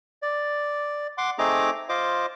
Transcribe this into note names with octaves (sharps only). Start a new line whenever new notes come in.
D5
F#5 C6 D6
A3 C4 D#4 G#4 A#5 D6
F4 C5 D#5 D6